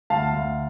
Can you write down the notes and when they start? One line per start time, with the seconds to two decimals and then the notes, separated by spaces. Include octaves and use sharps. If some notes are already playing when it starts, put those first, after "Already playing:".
0.10 D2 F5 A5
0.33 D2